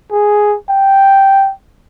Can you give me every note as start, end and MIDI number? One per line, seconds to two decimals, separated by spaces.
0.11 0.56 68
0.69 1.51 79